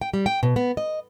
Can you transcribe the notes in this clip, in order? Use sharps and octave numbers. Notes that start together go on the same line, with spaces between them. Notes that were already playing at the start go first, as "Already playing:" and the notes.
G5
G3
G5
B2
B3
D#5